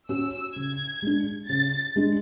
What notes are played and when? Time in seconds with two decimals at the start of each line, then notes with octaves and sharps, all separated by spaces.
0.09 C#4 F#4 E6
0.55 C#3 G#6
1.02 G#3 D4
1.49 C#3 A6
1.96 G#3 D4